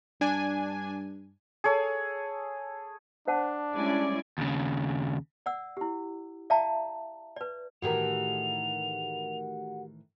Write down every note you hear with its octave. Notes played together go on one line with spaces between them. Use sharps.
G2 D4 G#5
G#4 A4 C#5
D4 C5 F#5 A5
G3 G#3 C#4 E4 D5 G#5
D#2 C#3
D5 F#5 E6
E4 G4
D5 E5 F5 G5 A5 A#5
B4 D5
A2 D#3 E3 F#4 G4 A#4 F#5 F7